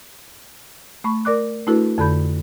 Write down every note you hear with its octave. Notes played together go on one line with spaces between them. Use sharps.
A3 B5 C#6
A#4 D5 D6 F#6
A3 D4 E4 F#4 A4 B4
F2 D3 A4 B5 G6